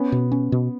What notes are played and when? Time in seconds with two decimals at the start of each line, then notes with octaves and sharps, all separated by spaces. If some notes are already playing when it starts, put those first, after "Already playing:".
Already playing: B3 C#4
0.12 B2
0.32 C#4
0.52 B2